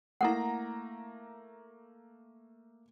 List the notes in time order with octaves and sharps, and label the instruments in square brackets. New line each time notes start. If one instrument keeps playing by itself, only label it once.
[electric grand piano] A3 A#3 A#5 [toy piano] E4 A4 F#5